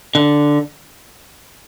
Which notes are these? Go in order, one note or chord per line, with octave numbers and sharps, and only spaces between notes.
D3